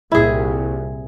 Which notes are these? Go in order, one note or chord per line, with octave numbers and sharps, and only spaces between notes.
C2 A#2 E4 G#4